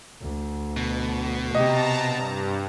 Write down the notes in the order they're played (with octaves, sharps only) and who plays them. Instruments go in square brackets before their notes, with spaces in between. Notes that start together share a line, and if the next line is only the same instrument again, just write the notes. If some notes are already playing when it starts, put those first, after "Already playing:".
[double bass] D2
[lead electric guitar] B2
[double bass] C3 [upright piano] G4 D#5 [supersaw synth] A5 A#5
[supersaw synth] G2